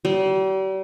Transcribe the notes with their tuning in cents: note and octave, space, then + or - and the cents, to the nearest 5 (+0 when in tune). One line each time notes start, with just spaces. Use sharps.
G3 -40